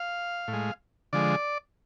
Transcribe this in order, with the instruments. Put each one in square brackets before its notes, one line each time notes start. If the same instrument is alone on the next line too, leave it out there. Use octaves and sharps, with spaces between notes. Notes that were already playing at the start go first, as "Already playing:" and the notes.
Already playing: [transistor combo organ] F5
A2
G#3
D3 F3 G#3 D5